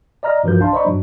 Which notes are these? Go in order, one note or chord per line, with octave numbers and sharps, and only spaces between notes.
D5 D#5 A#5 F6 A#6
G2 E3 F3 F#4 A#4 G6
B1 D4 F5 A5 C6
C5 D5 D#5 A#5 B5 C#6
G2 F#3 D4